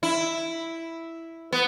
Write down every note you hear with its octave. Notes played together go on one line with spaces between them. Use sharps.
E4
B3